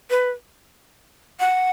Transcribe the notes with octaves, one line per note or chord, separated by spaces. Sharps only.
B4
F#5